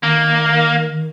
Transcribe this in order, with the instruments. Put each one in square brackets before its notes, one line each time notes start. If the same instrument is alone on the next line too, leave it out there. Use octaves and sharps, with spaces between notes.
[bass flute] D#3 [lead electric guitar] A#3